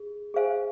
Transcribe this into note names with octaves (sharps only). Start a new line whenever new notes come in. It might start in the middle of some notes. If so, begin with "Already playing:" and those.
Already playing: G#4
G#4 C5 F5 G#5